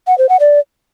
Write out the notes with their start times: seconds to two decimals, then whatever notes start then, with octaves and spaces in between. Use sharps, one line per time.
0.07 F#5
0.18 C5
0.29 F#5
0.40 D5